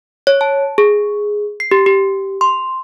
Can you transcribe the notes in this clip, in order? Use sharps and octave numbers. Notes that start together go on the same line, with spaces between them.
C#5
A5
G#4
C7
G4
G4
C6